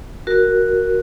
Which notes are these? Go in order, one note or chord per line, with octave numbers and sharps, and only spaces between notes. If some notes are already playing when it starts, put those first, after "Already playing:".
F#4 A#4